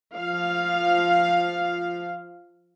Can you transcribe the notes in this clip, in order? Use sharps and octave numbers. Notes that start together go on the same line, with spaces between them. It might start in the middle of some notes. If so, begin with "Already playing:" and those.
F3 F5